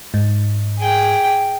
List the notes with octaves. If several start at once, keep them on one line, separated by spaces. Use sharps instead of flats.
G#2
G#4 G5